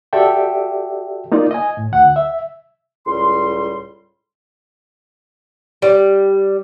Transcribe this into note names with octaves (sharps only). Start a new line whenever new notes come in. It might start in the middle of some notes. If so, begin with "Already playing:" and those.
F#4 G4 A4 D5 E5 G5
A#3 D#4 F4 D5
D#5 G#5
A2
D2 F#5
E5
C#2 A2 G3 C6
G3